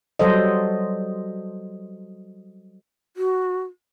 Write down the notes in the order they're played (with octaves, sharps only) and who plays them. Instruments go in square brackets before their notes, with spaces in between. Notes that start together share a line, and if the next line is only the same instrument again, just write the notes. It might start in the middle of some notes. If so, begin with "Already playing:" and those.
[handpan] F#3 G3 A4 C5 D#5
[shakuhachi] F#4